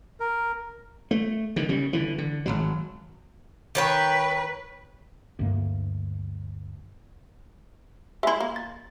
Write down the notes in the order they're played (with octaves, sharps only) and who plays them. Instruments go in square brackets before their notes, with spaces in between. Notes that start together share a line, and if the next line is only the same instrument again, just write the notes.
[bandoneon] A#4
[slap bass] A3
D3 D#3
C#3 G3
D3 E3
D3
G#1 C#2 F#3
[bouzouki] D#3 C#5 G5 [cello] B4
[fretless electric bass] D2 G2 A#3
[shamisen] G#3 E4 [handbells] E5 C6
[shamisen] A#3
[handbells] A6